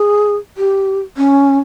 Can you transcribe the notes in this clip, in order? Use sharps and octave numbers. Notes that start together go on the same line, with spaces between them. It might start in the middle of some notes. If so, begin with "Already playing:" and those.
Already playing: G#4
G4
C#4